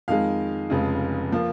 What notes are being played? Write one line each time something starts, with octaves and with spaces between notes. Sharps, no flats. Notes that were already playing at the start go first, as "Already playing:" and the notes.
F2 D#3 G#3 F5
F1 F2 C#3 G#3
F3 A#3